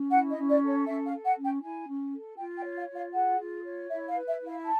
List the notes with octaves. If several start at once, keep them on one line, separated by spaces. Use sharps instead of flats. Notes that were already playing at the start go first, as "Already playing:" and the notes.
Already playing: C#4
E4 F#5
D#5
C#4
D5
A4
C#5
C#4 E5
F5
A4
F#5
C#4
G5
E4 G#5
C#4
A4
F4 G5
G5
C#5
F5
F4
F5
G#4 F#5
F4
C#5
E4 E5
F5
B4
E5
E4
F5
A5